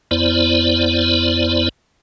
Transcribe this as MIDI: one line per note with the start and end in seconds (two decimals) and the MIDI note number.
0.11 1.69 41
0.11 1.69 59
0.11 1.69 64
0.11 1.69 72
0.11 1.69 74